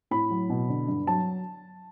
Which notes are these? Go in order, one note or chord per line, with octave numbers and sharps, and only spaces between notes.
A2 B5
F#3
B2
D3
G2
F#3 A5